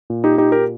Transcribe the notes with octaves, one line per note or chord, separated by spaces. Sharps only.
A#2
D#4 G4
D#4 G4
G4 A#4